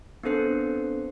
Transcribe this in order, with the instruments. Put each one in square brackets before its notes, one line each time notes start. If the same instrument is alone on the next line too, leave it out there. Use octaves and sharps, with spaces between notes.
[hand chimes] B3 C4 D4 A4 C5 C7